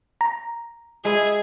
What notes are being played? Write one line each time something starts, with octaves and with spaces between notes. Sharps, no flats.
A#5
G#3 E4 G#4